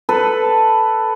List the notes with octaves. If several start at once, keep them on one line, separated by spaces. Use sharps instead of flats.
A4 B4